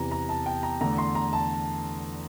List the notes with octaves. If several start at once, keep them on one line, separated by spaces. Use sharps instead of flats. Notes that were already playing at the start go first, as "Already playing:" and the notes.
Already playing: E2 C3 E3 A#5
A#5
A5
G5
A#5
E2 D3 A3 A#5
C6
A#5
A5